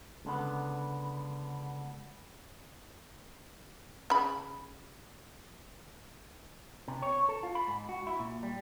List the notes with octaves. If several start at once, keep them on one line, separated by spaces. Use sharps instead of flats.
C#2 D3 B3
C#3 B5
C3
C#5
A4
F4
B5
G#2
F#4
E4
A#2
G3